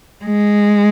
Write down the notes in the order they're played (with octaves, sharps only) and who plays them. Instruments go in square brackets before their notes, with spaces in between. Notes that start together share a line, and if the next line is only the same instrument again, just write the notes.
[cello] G#3